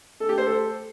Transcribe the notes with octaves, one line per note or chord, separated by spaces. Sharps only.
A4
G4
C5
A4